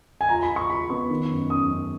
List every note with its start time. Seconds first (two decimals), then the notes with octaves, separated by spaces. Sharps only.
0.21 G#5
0.29 F4 A#5
0.43 B5
0.50 F4
0.56 C#6
0.70 F4 B5
0.90 B3 C#6
1.10 D#3
1.30 F#2
1.50 F#2 D#6
1.70 F#2